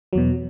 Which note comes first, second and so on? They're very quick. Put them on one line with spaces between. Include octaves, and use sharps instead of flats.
F#3 E2 B2